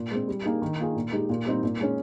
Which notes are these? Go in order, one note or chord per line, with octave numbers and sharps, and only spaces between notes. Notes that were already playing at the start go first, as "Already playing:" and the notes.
Already playing: A#2
G#3 C4
G3
A#3 D#4 G#4
D#3
A#3 F4 G#4
A#2
G#3 D#4 G4
A#2
G3 C4 D#4
A#2
G#3 C#4